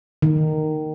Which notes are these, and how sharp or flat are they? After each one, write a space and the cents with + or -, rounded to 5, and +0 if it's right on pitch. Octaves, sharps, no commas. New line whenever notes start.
D#3 -10